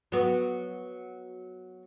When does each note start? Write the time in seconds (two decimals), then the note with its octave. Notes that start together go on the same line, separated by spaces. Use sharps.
0.12 F#3 B3